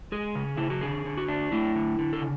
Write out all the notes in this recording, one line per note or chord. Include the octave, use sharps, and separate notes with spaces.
G#3 G#4
C#3
C#3 E4
F#4
D3 G#4
D3
F#4
D4
A3 E4
D3
D3
A4
C#3